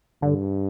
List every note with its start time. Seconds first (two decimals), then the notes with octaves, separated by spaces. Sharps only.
0.22 G2 D3